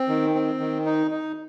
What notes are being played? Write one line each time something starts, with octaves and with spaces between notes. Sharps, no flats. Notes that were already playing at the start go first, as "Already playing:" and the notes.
Already playing: C4
D#3
C4
D#3
D#4
D#4